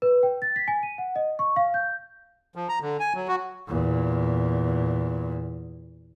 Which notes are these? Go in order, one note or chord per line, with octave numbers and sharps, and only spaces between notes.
B4
G5
A6
B6
G#5
D#7
F#5
D#5
C#6
F5
G6
F3
A#5
D3
G#5
F#3
F#4
E2 A#2